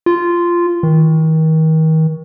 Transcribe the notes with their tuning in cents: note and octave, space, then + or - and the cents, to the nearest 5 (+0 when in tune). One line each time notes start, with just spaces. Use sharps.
F4 -10
D#3 +35